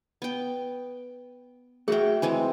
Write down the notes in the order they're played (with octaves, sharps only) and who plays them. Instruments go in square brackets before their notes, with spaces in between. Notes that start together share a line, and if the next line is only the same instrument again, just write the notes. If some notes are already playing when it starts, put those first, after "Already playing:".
[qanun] B3 G5
[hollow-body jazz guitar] A3 F#4 E5 [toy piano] G#4 [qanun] F#5 G5
[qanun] E3 G#3 C4